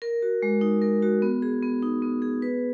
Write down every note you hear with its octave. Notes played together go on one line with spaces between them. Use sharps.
A#4
F#4
G#3
D#4
A#4
F#4
B3
G#4
B3
D#4
B3
G#4
B4